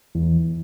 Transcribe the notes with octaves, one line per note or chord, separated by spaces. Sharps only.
E2